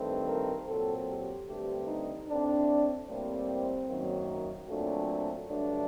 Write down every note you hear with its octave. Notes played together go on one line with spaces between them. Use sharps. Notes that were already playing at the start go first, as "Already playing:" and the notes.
Already playing: G2 D#3 A3 C4
A#4
A#2 F#3 C4 A4
G4
G2 D3 A3 C4 G4
D#4
A2 A3 C4 D4
A2 G3 A#3 C4
F#2 D#3 F#3 A#3
A#2 F#3 A3 C4 D4
G2 D3 F#3 A3 D4